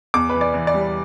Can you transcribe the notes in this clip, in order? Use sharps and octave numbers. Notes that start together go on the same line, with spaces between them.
E2 D6
E3 B4
D5
E3
D5
G3